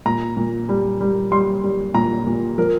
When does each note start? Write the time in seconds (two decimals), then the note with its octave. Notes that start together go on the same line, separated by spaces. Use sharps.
0.06 A#2 A#5
0.37 A#2
0.69 G3
1.01 G3
1.32 G3 C6
1.64 G3
1.94 A#2 A#5
2.27 A#2
2.58 F3 A#4